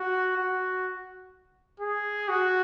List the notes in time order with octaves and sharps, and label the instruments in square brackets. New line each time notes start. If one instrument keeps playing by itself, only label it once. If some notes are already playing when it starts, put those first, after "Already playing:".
Already playing: [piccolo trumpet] F#4
F#4
G#4
F#4